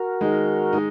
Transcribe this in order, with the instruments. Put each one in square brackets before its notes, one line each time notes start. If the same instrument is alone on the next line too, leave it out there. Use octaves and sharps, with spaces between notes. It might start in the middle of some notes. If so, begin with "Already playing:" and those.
Already playing: [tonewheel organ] F#4 A#4
[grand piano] D#3 G#3 D#4
G#3 D#4